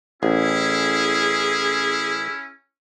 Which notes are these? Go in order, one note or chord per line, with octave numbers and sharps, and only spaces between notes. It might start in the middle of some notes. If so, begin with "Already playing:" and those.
A1 C#4 E4 G#4